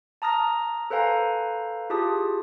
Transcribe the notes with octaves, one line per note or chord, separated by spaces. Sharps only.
A5 A#5 D#6 F6 A#6
A4 B4 C5 F5 G#5 A#5
E4 F4 G4 G#4 A5 D#6